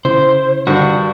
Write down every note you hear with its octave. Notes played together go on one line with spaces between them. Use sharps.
C#3 E4 C5
G2 D3 D#3 D4 F#4